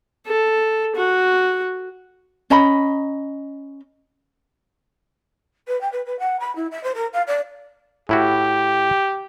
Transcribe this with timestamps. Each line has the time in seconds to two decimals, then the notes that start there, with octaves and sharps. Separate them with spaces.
0.27 A4
0.95 F#4
2.50 C#4 D#5 A#5 B5
5.67 B4
5.81 G5
5.92 B4
6.06 B4
6.19 F#5
6.40 B5
6.55 E4
6.71 E5
6.83 C5
6.94 A#4
7.13 F5
7.27 D5
8.09 A2 E4 F#4 G4